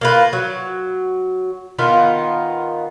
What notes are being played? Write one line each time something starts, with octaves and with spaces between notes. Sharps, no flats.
A#3 F4 B4
F#3
D#3 B3 D#4 F4